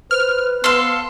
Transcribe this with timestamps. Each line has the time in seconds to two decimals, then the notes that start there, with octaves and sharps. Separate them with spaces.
0.11 B4 C5 F6
0.64 B3 A4 F5 C6